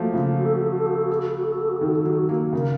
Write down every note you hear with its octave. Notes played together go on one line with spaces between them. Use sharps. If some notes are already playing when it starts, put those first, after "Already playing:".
Already playing: F3 F#3 A3 A#3
C#3 F4
F#4
A4
F#4
A4
F#4
A4
F#4
A4
F#4
A4
F#4
A4
F#4
A4
F#4
A4
F#4
A4
D#3 F#4
A4
F#4
D#3 F#3 A4
F#4
F#3 A#3
C#3 A#4